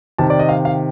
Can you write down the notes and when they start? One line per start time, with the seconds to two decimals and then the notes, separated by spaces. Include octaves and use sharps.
0.18 C3 D#3 A5
0.30 D5
0.39 D#5
0.49 F5
0.65 F5